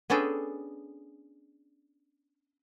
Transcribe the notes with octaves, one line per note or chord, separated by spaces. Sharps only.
B3 C#4 D4 G#4 A4 G5